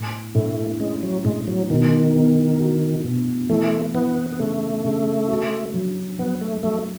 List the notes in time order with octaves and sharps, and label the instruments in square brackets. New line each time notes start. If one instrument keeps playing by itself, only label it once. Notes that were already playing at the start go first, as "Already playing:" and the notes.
Already playing: [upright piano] A2
[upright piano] A2 [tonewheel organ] A3
[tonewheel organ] G#3 [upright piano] C#4
[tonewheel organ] F#3
[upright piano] A2 [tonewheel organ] G#3
[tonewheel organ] F#3
[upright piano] B2 [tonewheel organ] D#3
[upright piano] B3
F#4
B2
[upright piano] E3 [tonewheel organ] A3
[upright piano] E3 [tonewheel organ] B3
[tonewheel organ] B3
[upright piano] C#3 [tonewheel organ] A3
[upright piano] C#3
F#4
F#3
[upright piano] F#3 [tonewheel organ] B3
[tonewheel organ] A3
[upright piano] F#3 [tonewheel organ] A3